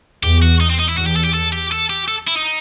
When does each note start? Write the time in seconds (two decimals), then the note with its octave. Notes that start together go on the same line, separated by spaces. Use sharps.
0.23 E2 G4
0.42 F#4
0.60 D#4
0.70 C4
0.79 D#4
0.88 E4
0.97 E2 F#4
1.06 G4
1.16 A4
1.24 G4
1.34 A4
1.53 G4
1.72 A4
1.90 G4
2.08 A4
2.27 E4
2.36 D#4